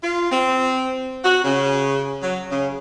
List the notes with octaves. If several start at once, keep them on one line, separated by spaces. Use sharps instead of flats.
F4
C4
F#4
C#3
F#3
C#3